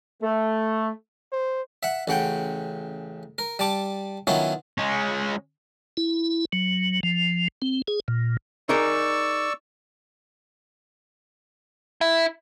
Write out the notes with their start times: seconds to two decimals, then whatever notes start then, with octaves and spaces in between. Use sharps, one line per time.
0.22 A3
1.32 C5
1.83 E5 F#5
2.08 A1 C#3 F#5 G5
3.38 A#4
3.59 G3 A5 D6
4.27 D#3 F#3 B3 C#4 E4 F4
4.78 G#3 C#4
5.97 E4
6.53 F#3
7.03 F3
7.62 C4
7.88 G#4
8.08 A#2
8.69 D#4 G#4 A#4 D5 C#6 E6
12.01 E4